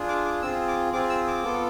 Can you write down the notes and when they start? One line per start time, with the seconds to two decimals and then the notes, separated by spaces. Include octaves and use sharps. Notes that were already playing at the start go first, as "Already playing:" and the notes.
Already playing: D4 F4 G#4
0.08 D6
0.25 D6
0.42 C4 F4 G#4 E6
0.68 D6
0.93 C4 F4 G#4 D6
1.10 E6
1.27 D6
1.44 B3 F4 A4